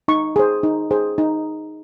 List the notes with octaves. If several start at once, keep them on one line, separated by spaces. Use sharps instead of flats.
D#4 C#6
G#4 C5
D#4
G#4 C5
D#4